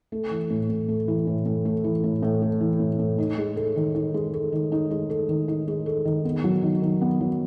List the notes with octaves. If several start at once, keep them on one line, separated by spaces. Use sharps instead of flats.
A3
E3
A2
A2
A3
E3
A2
A2
A3
E3
A2
A2
A3
E3
A2
A2
D#4
G#3
A4
D#3
D#4
G#3
A4
D#3
D#4
G#3
A4
D#3
D#4
G#3
A4
D#3
B3
F#3
D#3
D#3
B3
F#3